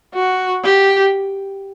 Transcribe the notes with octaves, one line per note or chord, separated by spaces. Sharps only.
F#4
G4